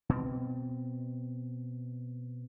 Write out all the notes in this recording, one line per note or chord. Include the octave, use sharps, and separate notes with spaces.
B2 C4